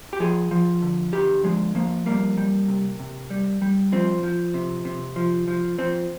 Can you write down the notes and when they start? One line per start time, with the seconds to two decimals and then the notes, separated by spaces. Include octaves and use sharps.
0.13 G4
0.20 F3 G#4
0.51 F3
0.82 D3
1.13 D3 G4
1.44 F3 G#3
1.75 F3 A#3
2.06 G3 A#3
2.38 G3
2.68 C3
3.00 C3
3.30 G3
3.62 G3
3.92 F3 C4
4.23 F3
4.54 C3
4.85 C3
5.16 F3
5.48 F3
5.78 F3 C4